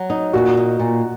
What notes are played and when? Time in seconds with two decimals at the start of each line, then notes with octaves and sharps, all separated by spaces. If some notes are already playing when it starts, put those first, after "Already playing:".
Already playing: F#3
0.10 D#4
0.33 A#2 F#4
0.57 D#4
0.79 A#2